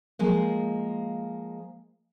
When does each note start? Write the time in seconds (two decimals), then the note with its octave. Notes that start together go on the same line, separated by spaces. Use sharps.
0.19 F3 G#3 A#3